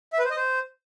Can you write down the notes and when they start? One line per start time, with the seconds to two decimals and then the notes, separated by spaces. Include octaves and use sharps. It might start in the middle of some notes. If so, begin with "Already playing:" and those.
0.13 E5
0.19 B4
0.25 C5
0.31 D#5
0.37 C5